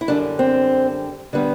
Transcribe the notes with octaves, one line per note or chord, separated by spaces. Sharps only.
E4
F#2 D3 G3 D4
C4
D3 G3 B3